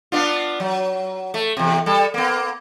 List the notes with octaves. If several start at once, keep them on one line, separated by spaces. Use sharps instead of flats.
B3 D4 F4
F#3
A3
E2 C3
G3 A4
A#3 B3